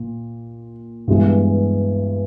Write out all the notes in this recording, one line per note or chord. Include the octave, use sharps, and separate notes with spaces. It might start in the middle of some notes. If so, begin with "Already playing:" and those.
Already playing: A#2
G2 E3 G#3 B3